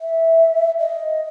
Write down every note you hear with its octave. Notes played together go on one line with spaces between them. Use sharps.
E5
D#5